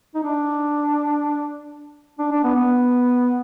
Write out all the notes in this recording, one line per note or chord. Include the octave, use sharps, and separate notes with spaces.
D#4
D4
D4
D4
B3
B3